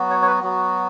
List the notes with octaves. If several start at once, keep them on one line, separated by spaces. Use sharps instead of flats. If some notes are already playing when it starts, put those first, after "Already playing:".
Already playing: F#3 B3 F#4
C#5
C#5
B4
F#3 B3 F#4